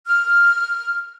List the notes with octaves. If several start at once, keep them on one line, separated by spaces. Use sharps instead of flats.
F6